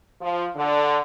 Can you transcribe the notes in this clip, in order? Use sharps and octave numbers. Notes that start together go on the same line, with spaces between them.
F3
D3